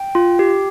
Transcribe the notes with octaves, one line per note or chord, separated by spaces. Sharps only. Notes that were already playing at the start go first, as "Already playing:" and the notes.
Already playing: G5
F4
G4